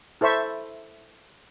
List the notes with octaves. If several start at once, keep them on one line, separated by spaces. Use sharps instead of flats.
E4 A4 C5 E5 C#6